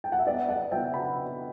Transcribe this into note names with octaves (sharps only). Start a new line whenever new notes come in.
G5
F#5
E5
B3 B4 D5
D5 F#5
B3 E5 G5
G5 B5